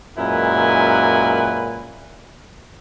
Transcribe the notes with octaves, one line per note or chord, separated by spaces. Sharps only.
F#2 A#2 G#3 E4 B4 G#5